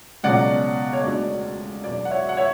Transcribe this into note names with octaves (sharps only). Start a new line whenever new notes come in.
C#2 B2 F#3 D5 F#5
C#5
E1 D2 D3 D5
E2 B2 F#3 D5
F#5
C#5 E5
F#5
C#5 E5